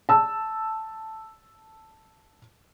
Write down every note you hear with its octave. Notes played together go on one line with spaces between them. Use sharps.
A5 E6